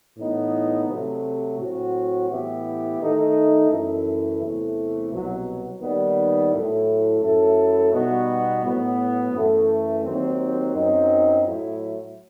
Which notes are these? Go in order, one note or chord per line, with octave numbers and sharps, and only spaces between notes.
A2 E3 B3 D#4
C3 F#3 A3
A2 F#3 C4 F#4
A2 E3 B3 E4 G4
D#3 A3 D#4 A4
F#2 E3 A3 E4
E2 C3 E3 A3
C2 B2 F#3 B3
D#2 D#3 G3 B3
A2 F#3 A3 E4
F#2 F#3 A3 E4 A4
B2 G3 B3 D#4 F#4
A2 F#3 B3
F#2 E3 A3
D#2 D#3 F#3 C4
F#2 F#3 C4 D#4
A2 F#3 A3 E4